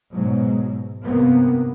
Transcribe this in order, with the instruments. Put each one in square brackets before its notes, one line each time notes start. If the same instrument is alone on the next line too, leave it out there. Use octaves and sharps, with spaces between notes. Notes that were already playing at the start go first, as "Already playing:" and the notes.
[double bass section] G#2 B2 F#3 G#3
G2 C3 A#3 B3